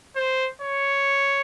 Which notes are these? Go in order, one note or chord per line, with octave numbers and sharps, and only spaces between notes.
C5
C#5